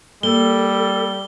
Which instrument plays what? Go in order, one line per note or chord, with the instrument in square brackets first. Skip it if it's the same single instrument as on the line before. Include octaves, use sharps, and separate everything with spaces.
[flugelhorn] G3 [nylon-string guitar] A#3 [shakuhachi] A4 [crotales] G7